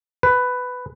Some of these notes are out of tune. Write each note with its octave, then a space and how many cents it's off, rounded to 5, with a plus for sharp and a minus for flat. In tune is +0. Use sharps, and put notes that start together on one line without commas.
B4 +10